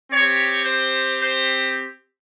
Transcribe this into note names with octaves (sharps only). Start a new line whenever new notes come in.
C4 G4 C#5
C5
C5